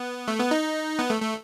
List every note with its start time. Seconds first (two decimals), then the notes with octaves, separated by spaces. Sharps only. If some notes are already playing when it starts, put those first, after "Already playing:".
Already playing: B3
0.28 A3
0.40 B3
0.51 D#4
0.99 B3
1.10 A3
1.22 A3